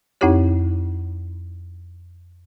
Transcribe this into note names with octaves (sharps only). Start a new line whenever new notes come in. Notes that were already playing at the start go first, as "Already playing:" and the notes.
F2 C4 D#4 E4 G4 C#5